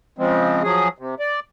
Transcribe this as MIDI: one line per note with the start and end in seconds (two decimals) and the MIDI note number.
0.18 0.63 49
0.18 0.63 53
0.18 0.63 56
0.18 0.63 60
0.64 0.89 53
0.64 0.89 54
0.64 0.89 68
0.98 1.15 48
1.20 1.40 74